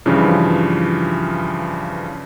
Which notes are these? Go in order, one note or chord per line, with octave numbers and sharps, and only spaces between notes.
G2 C#3 E3 F3